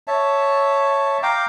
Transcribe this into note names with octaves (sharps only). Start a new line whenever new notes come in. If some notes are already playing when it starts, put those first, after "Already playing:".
C#5 E5 A5
F5 G5 A#5 D6